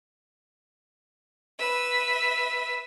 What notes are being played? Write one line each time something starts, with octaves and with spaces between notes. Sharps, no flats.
B4 E5